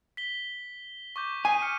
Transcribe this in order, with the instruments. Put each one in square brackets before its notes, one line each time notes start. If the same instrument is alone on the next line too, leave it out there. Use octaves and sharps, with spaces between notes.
[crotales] B6 G7
C#6 D6 G6
[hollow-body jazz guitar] G#5 [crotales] D#6 C7 D#7
[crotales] F6 C#7 D#7